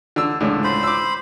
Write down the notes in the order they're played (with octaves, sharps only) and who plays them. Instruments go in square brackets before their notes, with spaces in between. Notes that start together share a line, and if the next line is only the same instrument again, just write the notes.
[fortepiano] D3 E6
C#2 A2 D3
[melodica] C5 B5
[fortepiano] D6 E6